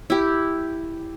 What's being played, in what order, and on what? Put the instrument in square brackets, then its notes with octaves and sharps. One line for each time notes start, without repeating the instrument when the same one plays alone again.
[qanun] E4 G4